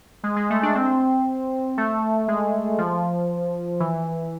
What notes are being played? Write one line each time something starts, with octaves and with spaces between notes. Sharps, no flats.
G#3
G#3
A3
D4
C4
A3
G#3
F3
E3